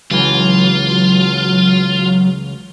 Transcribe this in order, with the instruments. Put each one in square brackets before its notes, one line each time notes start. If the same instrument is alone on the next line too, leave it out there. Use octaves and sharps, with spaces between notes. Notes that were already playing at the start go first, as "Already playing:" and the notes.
[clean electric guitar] C#2 E3 [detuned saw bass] F#3 [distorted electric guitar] F4